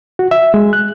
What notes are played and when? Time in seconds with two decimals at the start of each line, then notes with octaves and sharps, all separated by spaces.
0.19 F#4
0.31 E5
0.54 G#3
0.73 F#6